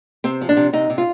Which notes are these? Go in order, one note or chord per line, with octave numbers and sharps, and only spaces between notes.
C3 C4
F3
D4
C3
C3 D#4
C3
F4